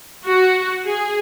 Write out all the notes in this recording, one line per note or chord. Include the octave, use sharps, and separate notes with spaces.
F#4
G#4